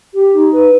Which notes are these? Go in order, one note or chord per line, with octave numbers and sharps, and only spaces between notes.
G4
D#4
B4